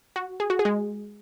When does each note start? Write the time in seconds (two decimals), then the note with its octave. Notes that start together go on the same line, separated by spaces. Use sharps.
0.16 F#4
0.40 G#4
0.50 F#4
0.59 G#4
0.65 G#3